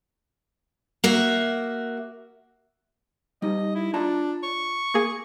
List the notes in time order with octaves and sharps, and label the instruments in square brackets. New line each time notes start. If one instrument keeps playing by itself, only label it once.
[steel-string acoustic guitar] A#3 F#4 E5
[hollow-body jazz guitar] G3 D#4 [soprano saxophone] D#5
[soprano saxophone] E4
[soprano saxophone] D4 [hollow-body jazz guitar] F4 A5 A#5
[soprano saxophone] C#6
[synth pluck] A#3 G#4